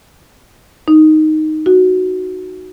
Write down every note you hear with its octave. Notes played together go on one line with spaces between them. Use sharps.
D#4
F#4